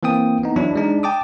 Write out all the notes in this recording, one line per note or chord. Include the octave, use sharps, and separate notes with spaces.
E3 A#3 C4 G5 D#6
B3 D#4
E3 F#3 D4 E4
G#3 D4 D#4
G5 A5 D6 D#6